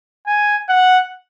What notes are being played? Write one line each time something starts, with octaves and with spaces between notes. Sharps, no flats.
G#5
F#5